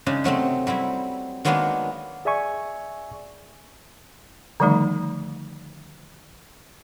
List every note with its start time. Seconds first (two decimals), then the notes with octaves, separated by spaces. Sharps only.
0.06 C#3 G#3 D4 D#4
0.24 C3 F#3 A3 C4
0.67 F#3 G3 C4 E4
1.45 D#3 F#3 G#3 A#3 B3 D4
2.25 G#4 D5 E5 G#5 C#6
4.60 D3 D#3 F3 G3 A3 D#4